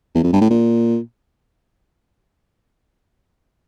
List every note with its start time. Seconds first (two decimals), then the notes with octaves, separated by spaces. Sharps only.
0.15 E2
0.23 F2
0.33 G2
0.41 A2
0.50 A#2